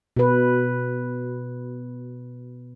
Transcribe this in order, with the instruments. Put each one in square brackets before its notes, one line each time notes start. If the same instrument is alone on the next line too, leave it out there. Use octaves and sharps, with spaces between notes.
[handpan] B2 B4